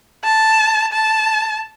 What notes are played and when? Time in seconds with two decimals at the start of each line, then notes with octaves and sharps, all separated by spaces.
0.24 A5
0.93 A5